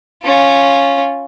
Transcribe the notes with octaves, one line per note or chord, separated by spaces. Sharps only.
C#4 F4